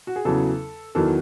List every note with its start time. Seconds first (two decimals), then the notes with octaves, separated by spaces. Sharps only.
0.07 F#4
0.16 G#4
0.25 E2 C#3 F#3 A4
0.95 E2 D#3 F#3 A4